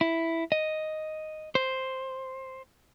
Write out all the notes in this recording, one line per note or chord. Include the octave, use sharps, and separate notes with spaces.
E4
D#5
C5